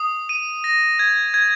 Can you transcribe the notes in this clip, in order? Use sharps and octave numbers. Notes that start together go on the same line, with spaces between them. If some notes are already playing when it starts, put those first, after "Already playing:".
Already playing: D#6
D#7
A#6
G#6
G#6